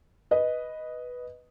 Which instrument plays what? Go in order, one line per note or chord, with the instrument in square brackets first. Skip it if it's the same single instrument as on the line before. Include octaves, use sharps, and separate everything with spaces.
[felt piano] B4 D#5